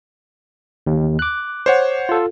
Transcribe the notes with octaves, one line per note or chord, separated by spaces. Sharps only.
D#2
D6 F#6
C5 C#5 F#5
F4 A4